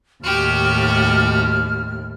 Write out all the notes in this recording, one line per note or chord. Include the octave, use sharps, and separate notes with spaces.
D#2 A2 F#4 G4 F6